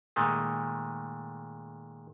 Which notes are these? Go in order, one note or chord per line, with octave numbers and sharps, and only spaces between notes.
A#2 D#3 G#3 A3